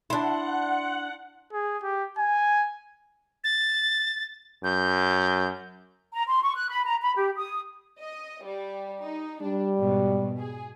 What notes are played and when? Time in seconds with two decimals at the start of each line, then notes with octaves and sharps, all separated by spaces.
0.10 D4 E4 F#5 A5 C6
1.53 G#4
1.83 G4
2.18 G#5
3.44 A6
4.64 F#2 G6
6.13 A#5
6.27 C6
6.43 C#6
6.55 F#6
6.69 B5
6.85 A#5
7.01 B5
7.16 G4
7.36 D#6
8.01 D#5
8.45 G3
9.03 D#4
9.42 G3 D4
9.76 G#2 B2
10.39 G#4